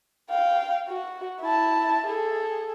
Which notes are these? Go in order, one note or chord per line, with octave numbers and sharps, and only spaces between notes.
F5 G5
F#4
E4 A5
G#4 A4